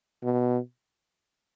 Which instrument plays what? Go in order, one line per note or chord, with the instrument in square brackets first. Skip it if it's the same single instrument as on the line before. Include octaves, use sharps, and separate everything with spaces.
[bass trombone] B2